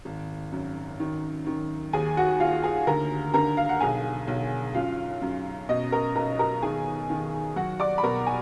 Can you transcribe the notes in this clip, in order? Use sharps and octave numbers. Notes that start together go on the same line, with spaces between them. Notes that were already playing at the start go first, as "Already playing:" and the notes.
G#1
F#2
D#3
D#3
D#2 G#4 G#5
F#4 F#5
D#2 F4 F5
G#4 G#5
D2 A#4 A#5
D3 A#4 A#5
F5
F#5
B1 G#4 G#5
B1
F#2 F4 F5
F#2
B2 D#5
A#4 A#5
B1 A#4 A#5
A#4 A#5
D#3 G#4 G#5
D#3
F#3 F#4 F#5
D5 D6
B5
B2 A#4 A#5
G#5